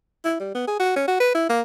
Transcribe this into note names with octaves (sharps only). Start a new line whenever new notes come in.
E4
G3
B3
G#4
F#4
C#4
F#4
B4
E4
A#3